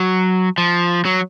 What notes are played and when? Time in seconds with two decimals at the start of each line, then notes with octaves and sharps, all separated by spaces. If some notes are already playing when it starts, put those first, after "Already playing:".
Already playing: F#3
0.58 F3
1.05 F#3